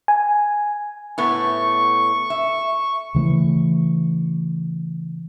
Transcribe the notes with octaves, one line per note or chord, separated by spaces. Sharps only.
G#5
A2 A3 B3 C#6
E5
C#3 E3 A3